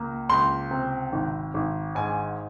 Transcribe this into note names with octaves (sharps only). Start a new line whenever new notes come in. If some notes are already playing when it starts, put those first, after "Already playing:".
Already playing: C#2 A#3
C#2 C6
C3
G#1
G#1
G#2 G#5